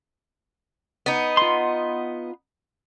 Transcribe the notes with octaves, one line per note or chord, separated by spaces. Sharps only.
B3 D#4
F4 C6